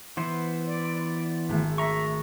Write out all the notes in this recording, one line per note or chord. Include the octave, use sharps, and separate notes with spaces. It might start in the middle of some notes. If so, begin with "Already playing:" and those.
E3 B3 C5
D5
G#1 A3
E5 A#5 C#6